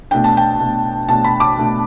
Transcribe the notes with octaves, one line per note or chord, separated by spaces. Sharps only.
B2 A3 D4 G5
A5
G5
B2 A3 D4
B2 A3 D4 A5
B5
D6
B2 A3 D4